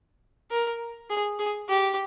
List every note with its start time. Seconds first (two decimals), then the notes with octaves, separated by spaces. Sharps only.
0.51 A#4
1.10 G#4
1.39 G#4
1.69 G4